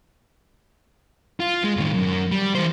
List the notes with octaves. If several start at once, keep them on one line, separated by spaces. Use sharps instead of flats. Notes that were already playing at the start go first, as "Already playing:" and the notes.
F4
G#3
A2 D#3
F#2
G3
E3 C5